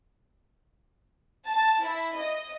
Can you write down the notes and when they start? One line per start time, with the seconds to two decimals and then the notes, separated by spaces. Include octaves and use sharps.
1.47 A5
1.83 E4
2.18 D#5